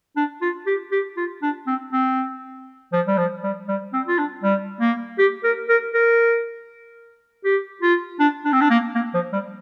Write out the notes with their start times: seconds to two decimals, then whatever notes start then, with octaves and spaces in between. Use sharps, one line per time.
0.17 D4
0.42 F4
0.67 G4
0.92 G4
1.17 F4
1.42 D4
1.67 C4
1.93 C4
2.93 F3
3.08 G3
3.18 F3
3.43 G3
3.68 G3
3.93 C4
4.07 F4
4.18 D4
4.43 G3
4.81 A#3
5.18 G4
5.44 A#4
5.69 A#4
5.94 A#4
7.45 G4
7.82 F4
8.20 D4
8.45 D4
8.53 C4
8.61 D4
8.70 A#3
8.95 A#3
9.14 F3
9.33 G3